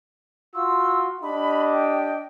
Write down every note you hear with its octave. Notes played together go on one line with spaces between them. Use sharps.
F4 F#4 C6 E6
D4 G4 D#5 B5
G5